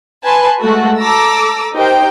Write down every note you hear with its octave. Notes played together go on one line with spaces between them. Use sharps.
B4 G#5 A5 C6
G#3 A3 F#4 A4
A4 A#5 D6 E6
D#4 G4 A#4 C5 G5